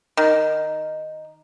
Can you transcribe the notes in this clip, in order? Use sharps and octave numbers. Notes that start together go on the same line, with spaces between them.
D#3